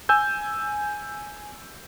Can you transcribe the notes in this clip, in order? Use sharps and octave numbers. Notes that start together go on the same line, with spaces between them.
G#5 E6 G6